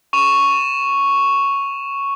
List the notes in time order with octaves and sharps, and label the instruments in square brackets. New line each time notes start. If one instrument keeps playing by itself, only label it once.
[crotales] C#6 E7 F7